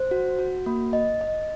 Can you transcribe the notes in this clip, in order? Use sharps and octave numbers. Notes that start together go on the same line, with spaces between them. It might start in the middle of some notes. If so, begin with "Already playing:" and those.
Already playing: C5
F#4
F#4
A#3
D#5
D#5